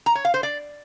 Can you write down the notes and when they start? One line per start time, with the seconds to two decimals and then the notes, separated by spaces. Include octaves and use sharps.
0.06 A#5
0.15 C#5
0.25 F5
0.34 C5
0.43 D5